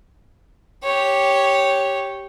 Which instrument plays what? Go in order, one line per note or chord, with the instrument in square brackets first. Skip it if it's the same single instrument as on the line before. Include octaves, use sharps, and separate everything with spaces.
[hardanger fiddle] G4 C#5